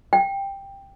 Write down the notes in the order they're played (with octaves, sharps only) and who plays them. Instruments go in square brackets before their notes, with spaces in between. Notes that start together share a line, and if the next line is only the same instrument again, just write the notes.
[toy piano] G5